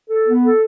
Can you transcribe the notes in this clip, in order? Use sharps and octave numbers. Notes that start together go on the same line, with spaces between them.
A4
B3
A4